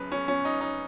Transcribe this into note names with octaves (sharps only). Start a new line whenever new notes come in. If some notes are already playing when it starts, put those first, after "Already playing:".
Already playing: F#1 F#2 C#3 B4
C#4
C#4
D#4
D#4